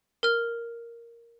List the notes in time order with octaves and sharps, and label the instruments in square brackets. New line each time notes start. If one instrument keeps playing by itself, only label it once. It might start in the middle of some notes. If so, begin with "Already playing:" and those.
[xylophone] A#4 F6